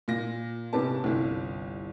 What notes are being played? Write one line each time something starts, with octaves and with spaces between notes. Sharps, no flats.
A#2 A#6
G#2 C3 B3 C#4 A5
G1 C2